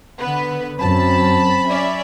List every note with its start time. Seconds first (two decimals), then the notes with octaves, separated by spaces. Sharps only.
0.20 D3 B3 B4
0.79 F#2 C4 A5 B5
1.69 C#4 D5 E5